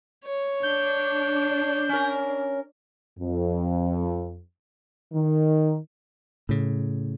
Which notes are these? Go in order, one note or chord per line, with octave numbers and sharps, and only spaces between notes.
C#5
D4 G6
C#4 A#4
F2
D#3
A2 C#3